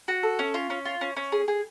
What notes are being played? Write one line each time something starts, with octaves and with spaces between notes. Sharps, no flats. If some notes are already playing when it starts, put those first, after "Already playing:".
F#4
A4
C#4
F4
C#4
F4
C#4
C#4
G#4
G#4